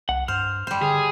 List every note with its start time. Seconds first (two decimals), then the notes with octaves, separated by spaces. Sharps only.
0.09 C2 F#5
0.28 G2 C5 F6
0.67 G3 C5
0.82 D3 G#4